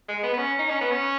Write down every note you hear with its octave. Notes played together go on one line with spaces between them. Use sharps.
G#3
B3
B3
C#4
D#4
C#4
B3
C#4